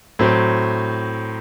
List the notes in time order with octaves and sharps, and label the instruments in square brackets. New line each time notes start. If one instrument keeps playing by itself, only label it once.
[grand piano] A2 F#3 C4